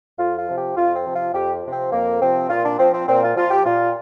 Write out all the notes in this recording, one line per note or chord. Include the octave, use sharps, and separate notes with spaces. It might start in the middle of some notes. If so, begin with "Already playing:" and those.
F2 F4
F4
C3 F3
G4
F2 F4
C4
C3 F3
F4
F2 G4
C3 F3
C4
F2 A#3
C3 F3 C4
A#2 F4
D4
F3 C4
C4
A#2 C4
F4
F3 F4
G4
A#2 F4